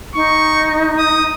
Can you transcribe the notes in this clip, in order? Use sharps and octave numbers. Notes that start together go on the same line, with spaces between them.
D#4 C#6
D#6